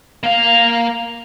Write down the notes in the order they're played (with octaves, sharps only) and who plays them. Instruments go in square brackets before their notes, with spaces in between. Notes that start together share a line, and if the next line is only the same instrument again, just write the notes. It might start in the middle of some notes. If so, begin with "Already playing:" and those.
[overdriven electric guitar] A#3 F5